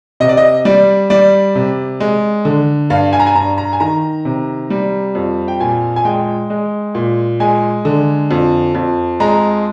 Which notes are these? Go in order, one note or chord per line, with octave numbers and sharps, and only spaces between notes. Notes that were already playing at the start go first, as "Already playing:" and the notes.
C3 D#5
D5
D#5
G3 D5
G3 D5
C3
G#3
D3
G2 F5
G#5
A#5
G#5
G2 A#5
A#5
G#5
D#3 A#5
C3
G3
F2
G5
A#2 G#5
G#5
G#3 G5
G#3
A#2
G#3 G#5
D3
F2
F2
G#3 A#5